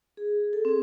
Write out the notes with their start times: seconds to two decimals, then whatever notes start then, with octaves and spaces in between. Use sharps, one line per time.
0.17 G#4
0.53 A4
0.65 C4 G#4